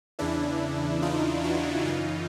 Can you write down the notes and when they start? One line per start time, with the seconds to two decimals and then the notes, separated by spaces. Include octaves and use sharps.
0.19 E2 C#3 E3 D4 E4
1.02 D#4 F4
1.44 E4 F#4
1.85 F#2 C#3 E3 D#4 F4